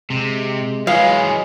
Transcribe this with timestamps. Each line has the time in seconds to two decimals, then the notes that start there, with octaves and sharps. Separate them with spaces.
0.10 C3 G#3
0.87 E3 F#3 G#3 B3 G#4 F5